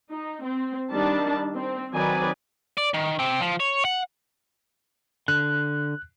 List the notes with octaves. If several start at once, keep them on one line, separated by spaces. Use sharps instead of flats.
D#4
C4
D#3 G3 D4 A5
C4
D#3 F#3 C4 B4 D5 G#5
D5
D#3
C4 G4
F3
C#5
F#5
D3 F#6